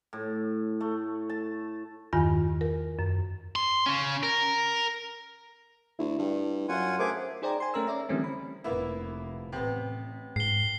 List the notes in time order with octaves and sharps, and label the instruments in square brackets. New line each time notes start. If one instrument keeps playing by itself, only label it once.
[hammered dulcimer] A2
A3
A5
[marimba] E2 G2 D#3 F4 G#5
A#4
F#2
[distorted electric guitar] C6
C#3 C#4
A#4
[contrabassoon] D2 [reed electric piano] E4
[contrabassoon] G2
[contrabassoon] F#2 [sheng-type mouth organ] F4 F#5 G#5
[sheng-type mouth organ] A3 G#4 D6 [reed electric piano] A#4 C5 G#6
[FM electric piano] D#4 G#4 C5 D5 G5 A#5
G#5 C6
A3 C#4 A#4 A#5 E6
C#5 D5 E5 A#5
D3 E3 G3 A3 C4 C#4
B5
[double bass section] F1 [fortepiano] A#3 B3 E4
[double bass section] A1 [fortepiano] C3 B3
[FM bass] G#2 [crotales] C7 G7